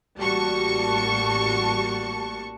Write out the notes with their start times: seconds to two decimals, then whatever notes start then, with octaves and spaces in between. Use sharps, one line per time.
0.17 A1 G3 A#3 F#4 A5 C#6